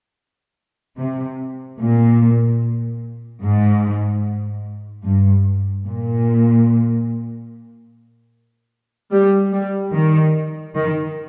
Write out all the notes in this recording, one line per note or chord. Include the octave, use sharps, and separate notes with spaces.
C3
A#2
G#2
G2
A#2
G3
G3
D#3
D#3